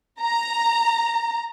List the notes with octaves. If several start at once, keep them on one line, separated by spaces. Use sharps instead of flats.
A#5